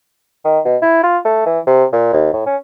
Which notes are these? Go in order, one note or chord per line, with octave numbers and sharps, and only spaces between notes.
D#3
B2
E4
F4
A3
E3
C3
A#2
D#2
A2
C#4